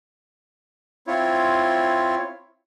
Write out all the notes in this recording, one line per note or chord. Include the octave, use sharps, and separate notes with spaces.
C4 E4 F4 C#5